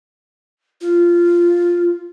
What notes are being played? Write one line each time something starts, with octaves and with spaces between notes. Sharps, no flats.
F4